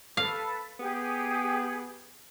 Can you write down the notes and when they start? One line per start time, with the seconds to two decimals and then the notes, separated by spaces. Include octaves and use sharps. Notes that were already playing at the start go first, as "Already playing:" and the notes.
0.17 A4 B4 F5
0.80 B3 G4 G#4